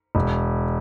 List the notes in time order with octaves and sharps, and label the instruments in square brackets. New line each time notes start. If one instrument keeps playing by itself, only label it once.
[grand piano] E1